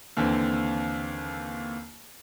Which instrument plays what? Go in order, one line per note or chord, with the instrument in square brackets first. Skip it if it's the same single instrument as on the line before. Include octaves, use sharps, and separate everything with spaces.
[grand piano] D#2 D3 E3 C4